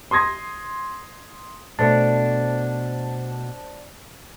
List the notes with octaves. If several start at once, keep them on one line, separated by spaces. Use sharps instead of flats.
C6 D#6 G#6 A#6
B2 A3 D4 C5 A5